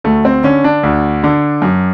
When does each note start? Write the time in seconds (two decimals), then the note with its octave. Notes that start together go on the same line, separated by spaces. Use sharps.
0.04 D2 A3
0.25 C4
0.43 D3 C#4
0.64 D4
0.83 D2
1.24 D3
1.62 F#2